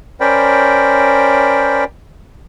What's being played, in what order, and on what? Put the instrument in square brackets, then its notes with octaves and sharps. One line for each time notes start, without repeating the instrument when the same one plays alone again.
[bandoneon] C#4 A#4 C5 D5 G5 B5